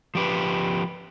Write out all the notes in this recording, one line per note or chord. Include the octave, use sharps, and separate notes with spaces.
F3 G4 B4